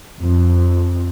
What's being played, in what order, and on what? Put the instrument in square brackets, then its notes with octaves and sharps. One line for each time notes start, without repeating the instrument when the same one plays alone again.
[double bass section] F2